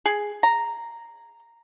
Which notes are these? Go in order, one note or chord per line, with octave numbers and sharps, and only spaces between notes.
G#4
A#5